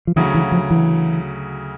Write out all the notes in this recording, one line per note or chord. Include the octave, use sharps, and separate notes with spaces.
F3
D2 C#3 E3 F#3
E3
F3
E3